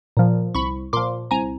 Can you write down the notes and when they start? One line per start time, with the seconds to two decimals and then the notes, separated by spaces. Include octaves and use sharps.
0.17 A#2 F3
0.55 C2 B5 C#6
0.93 A#2 F3 C6 D6
1.31 C2 G#5 A#5